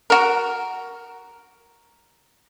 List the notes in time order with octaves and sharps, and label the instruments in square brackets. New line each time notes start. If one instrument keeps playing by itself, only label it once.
[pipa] F#4 A#4